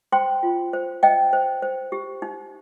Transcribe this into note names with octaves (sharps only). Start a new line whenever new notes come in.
C5 G5 C6
F4
C5
C5 D#5 G5
C5
C5
G4
D#4